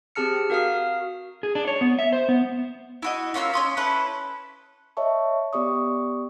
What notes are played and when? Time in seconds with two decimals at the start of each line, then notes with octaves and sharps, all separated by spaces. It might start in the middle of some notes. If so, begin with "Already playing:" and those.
0.15 C4 G4 G#4 A5 F6 C#7
0.50 F#4 A#4 F5 D#6 F6
1.43 G#4
1.55 D4
1.67 C#5
1.81 B3
1.99 E5
2.13 C5
2.29 B3
3.02 E4 F#4 D#5
3.34 A#3 C#4 F4 E6
3.53 C#4 C6 D#6
3.77 C#4 E4 A4 B4
4.97 C#5 D#5 E5 A5 C#6
5.53 B3 G4 D5 C#6 D#6